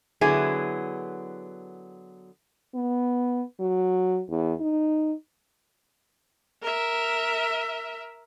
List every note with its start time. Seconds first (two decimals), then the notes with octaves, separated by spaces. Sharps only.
0.21 D3 F#3 B3 E4 G#4
2.75 B3
3.60 F#3
4.30 E2
4.60 D#4
6.62 A#4 E5